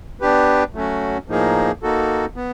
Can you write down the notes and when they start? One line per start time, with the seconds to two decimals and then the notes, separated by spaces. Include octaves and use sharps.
0.21 B3 D4 G4 B4
0.75 F#3 A3 C#4 F#4
1.28 A2 F3 A#3 D#4 G#4
1.82 A#3 D#4 F#4 A4
2.36 B3